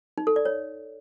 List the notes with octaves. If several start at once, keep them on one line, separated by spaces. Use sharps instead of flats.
D#4
A4
D5
C#5